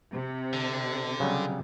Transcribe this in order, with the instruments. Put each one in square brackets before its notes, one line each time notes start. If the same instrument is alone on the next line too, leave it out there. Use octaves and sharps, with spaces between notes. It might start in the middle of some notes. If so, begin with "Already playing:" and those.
[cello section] C3
[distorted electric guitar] D3
[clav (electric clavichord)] C#3 F#3 G3